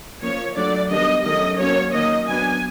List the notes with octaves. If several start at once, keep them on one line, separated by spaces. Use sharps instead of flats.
F3 A#3 C#4 C#5
F#3 A3 D4 D5
D#3 G3 B3 D4 D#5
D#3 F#3 A3 C#4 D#5
F#3 A#3 C#4 C#5
D#3 F#3 A#3 C#4 D#5
F#3 B3 D4 G#5